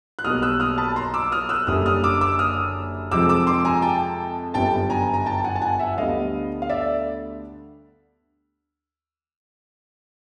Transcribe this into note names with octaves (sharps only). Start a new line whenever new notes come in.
F#6
B1 B2 G3 A#3 D#6 F6
E6 F#6
D#6 F6
A5 B5
A#5 C6
D6 E6
D#6 F6
E6 F#6
F#1 F#2 D3 G3 A#3 D#6 F6
D#6 F6
D6 E6
D6 E6
D#6 F6
F2 C3 F3 G#3 D6 E6
D6 E6
C6 D6
G#5 A#5
G5 A5
G1 F#2 D3 G3 B3 G5 A5
G#5 A#5
A#5
G5 A5
F#5 G#5
A5
F#5 G#5
E5 F#5
D2 D3 G3 B3 D#5 F5
F5
D5 E5